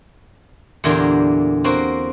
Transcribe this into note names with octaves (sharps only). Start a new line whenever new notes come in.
E2 A#2 D3 A#3 G4
A#3 C4 F#4